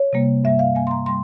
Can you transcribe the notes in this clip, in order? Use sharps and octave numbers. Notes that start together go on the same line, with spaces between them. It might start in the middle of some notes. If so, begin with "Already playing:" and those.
Already playing: C#5
C3 G3 A#3
G2 G3 A#3 E5
F5
G2 G3 A#3 G#5
C6
A#5
G3 C6